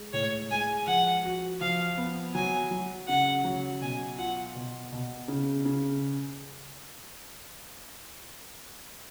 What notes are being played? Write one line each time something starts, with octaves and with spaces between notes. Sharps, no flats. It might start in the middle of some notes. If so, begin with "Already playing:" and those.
Already playing: G#3
A2 C#5
G#3 G#5
F3 F#5
F#4
F3 F5
B3
F#3 G#5
F#3
C#3 F#5
F#3
B2 G#5
F4 F#5
B2
B2
C#3
C#3